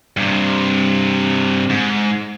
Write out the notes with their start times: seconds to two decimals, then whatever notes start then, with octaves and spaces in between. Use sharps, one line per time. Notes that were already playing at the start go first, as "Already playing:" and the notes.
0.17 G2 C3
1.70 G#2